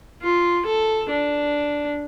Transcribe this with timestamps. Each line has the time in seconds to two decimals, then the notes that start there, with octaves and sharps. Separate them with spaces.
0.22 F4
0.66 A4
1.09 D4